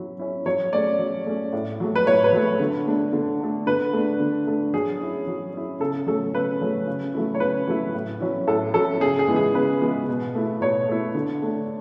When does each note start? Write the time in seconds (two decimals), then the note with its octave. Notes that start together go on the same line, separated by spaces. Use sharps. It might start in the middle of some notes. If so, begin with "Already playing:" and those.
Already playing: F#3 C#4 E4
0.19 C#4 E4
0.46 F#3 C#5
0.73 A3 C#4 D5
0.99 F#3
1.26 A3 C#4
1.53 A2
1.80 F#3 A3
1.96 B4
2.07 A2 C#5
2.24 B4
2.33 F#3 A3
2.60 D3
2.87 A3 D4
3.13 D3
3.41 A3 D4
3.67 D3 B4
3.93 A3 D4
4.20 D3
4.47 A3 D4
4.73 F#3 G#4
5.00 C#4 E4
5.27 F#3
5.53 C#4 E4
5.80 C#3 A4
6.07 F#3 A3 C#4 A4
6.34 C#3 B4
6.61 F#3 A3 C#4
6.87 C#3
7.14 F#3 A3 E4
7.34 C#5
7.40 C#3 B4
7.67 F#3 A3 E4
7.94 A2
8.20 F#3 C#4 E4
8.47 A2 A4
8.74 F#3 C#4 E4 A4
9.01 C#3 G#4
9.19 G#4
9.27 E3 G#3 B3 E4
9.36 G#4
9.54 C#3 B4
9.81 E3 G#3 B3 E4
10.08 B2
10.35 A3 E4
10.61 B2 C#5
10.88 A3 E4
11.15 D3
11.42 A3 D4